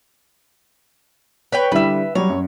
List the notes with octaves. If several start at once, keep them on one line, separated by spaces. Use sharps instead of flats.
B4 C#5 G5
D3 G3 E4 B4 E5
F#3 G3 C#5
F#2